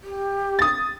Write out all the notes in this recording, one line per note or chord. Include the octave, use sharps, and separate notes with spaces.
G4
D#6 A6